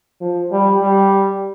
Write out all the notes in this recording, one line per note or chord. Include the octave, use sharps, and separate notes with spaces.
F3
G3
G3